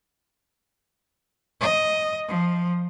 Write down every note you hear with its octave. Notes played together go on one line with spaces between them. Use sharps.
D#5
F3